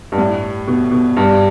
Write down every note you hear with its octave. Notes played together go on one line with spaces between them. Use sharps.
G2
A2
B2
B2
G2